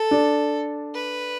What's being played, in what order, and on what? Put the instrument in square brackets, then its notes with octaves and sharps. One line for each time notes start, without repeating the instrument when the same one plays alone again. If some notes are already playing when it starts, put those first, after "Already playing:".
Already playing: [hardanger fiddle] A4
[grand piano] D4
[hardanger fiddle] B4